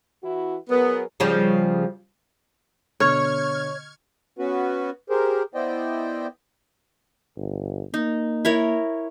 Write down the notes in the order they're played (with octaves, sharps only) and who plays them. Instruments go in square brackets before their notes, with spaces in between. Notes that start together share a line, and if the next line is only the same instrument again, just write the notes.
[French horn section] E3 E4 F#4
[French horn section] F#3 G#4 A#4 [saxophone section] B3
[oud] C#3 F3 G3
[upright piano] B2 D3 [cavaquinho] C#5 [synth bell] C#6 F6 G#6
[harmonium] B3 C#4 F#4 B4
G4 G#4 A#4 C5
B3 E4 C5 D5 D#5 G5
[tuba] G1
[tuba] A#3 [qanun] D#4
[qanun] E4 A#4 C#5